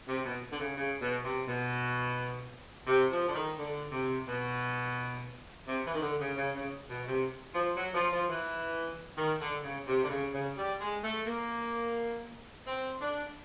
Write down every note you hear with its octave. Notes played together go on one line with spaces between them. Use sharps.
C3
B2
D3
C#3
C#3
B2
C3
B2
C3
F3
D3
D#3
D3
C3
B2
C3
E3
D#3
D3
C#3
C#3
C#3
B2
C3
F3
F#3
F3
F3
E3
D#3
D3
C#3
C3
D3
C#3
C#3
G3
G#3
A3
A#3
C4
D4